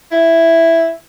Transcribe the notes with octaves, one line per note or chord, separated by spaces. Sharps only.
E4